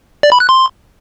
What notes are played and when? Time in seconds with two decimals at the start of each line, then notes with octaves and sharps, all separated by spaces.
0.23 D5
0.32 B5
0.40 F#6
0.49 C6